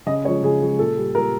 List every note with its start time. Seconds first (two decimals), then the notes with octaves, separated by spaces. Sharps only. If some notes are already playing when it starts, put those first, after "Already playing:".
0.06 C#3 D#5
0.25 G#3 C#5
0.28 F3
0.43 C#3 G#4
0.62 F3 G#3
0.79 A#2 A4
0.97 G3
1.15 A#2 A#4